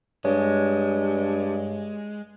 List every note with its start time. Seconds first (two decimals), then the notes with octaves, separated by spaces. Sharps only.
0.25 G2 G#3 C#5